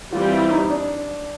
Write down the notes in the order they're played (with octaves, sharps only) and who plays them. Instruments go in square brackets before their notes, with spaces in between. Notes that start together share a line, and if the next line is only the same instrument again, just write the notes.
[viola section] E3 G3 C4 [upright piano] F4
[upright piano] E4
D#4
D4